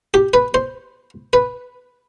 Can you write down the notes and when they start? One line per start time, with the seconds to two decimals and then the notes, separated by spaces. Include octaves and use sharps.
0.14 G4
0.34 B4
0.54 C5
1.33 B4